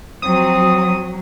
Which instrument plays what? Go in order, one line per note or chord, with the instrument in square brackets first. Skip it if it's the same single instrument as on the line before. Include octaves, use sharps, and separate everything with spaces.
[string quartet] F3 C4 [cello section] F#3 [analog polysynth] D#6